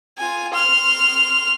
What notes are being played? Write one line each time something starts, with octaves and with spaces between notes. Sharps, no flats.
F4 G#5
C6 F6